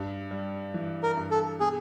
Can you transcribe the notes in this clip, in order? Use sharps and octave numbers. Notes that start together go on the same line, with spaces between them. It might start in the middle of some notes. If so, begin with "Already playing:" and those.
Already playing: G2
G3
E3
A#4
G2
A4
B2 G#4